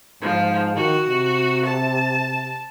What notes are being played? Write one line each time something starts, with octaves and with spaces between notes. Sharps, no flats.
G#2 F3
D#3 F#4
C3
A5